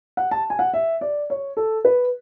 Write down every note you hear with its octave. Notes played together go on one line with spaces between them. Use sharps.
F#5
A5
G#5
F#5
E5
D5
C#5
A4
B4